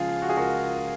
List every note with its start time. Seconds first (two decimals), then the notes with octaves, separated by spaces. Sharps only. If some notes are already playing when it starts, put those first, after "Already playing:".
Already playing: C#2 C#3 F3 F4 G#4
0.22 F#4
0.29 G#4
0.37 C#2 F#4 A#4